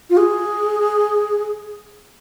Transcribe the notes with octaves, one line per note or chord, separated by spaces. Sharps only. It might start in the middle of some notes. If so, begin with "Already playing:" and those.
F4
G#4